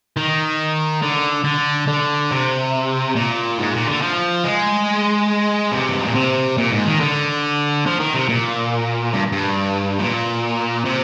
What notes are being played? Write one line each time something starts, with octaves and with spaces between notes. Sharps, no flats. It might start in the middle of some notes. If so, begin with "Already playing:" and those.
D#3
D3
D3
D3
C3
A#2
G#2
A#2
D3
F3
G#3
C3
G2
G#2
A#2
C3
A#2
G#2
D#3
D3
F3
D#3
C3
A#2
G2
G2
A#2
C3